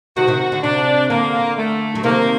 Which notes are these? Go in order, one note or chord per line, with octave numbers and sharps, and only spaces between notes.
C3 D#3 F#4
C3 D#3
D3
C3 D4
D3 A#3
A3
F#3
C3 D#3 A#3